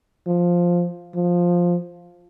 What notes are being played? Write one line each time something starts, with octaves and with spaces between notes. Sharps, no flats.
F3
F3